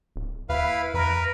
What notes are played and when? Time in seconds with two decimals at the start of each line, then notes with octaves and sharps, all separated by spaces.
0.16 D1
0.49 D#2 E4 B4 F5
0.94 F2 A#4 B4